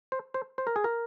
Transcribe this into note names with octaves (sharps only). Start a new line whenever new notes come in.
C5
C5
C5
A#4
G#4
A#4